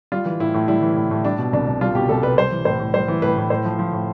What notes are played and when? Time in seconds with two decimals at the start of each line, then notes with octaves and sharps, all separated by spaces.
0.12 G3 F4
0.25 E3
0.40 A2 E4
0.54 A2
0.68 G3 E4
0.82 E3
0.96 A2
1.11 A2
1.24 G3 D4
1.38 B2
1.53 C2 D4
1.67 C2
1.81 G3 F4
1.95 B2 G4
2.09 C2 A4
2.23 C2 B4
2.38 G3 C5
2.51 E3
2.65 A2 C5
2.80 A2
2.94 G3 C5
3.08 E3
3.22 A2 B4
3.37 A2
3.50 A2 C5
3.64 F3
3.79 F3
3.93 A2